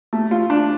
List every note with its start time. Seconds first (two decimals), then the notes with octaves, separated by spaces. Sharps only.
0.13 A3
0.31 F4
0.50 D4